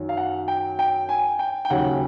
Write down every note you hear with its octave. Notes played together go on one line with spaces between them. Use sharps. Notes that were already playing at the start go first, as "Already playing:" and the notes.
Already playing: F#2 D#3 F#3
F5
F#5
G5
G5
G#5
G5
G5
D#2 C#3 F#3 F#5